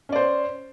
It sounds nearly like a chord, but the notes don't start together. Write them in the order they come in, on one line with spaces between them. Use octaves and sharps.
C#4 D5 C5